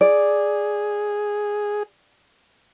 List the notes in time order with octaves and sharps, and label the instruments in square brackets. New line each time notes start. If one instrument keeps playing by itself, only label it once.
[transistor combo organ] G#4 [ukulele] D5